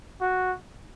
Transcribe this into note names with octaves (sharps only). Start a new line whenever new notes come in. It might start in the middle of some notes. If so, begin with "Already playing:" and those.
F#4